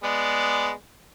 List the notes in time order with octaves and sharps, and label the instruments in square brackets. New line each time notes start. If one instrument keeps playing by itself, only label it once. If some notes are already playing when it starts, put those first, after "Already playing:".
[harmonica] G#3 B3 D5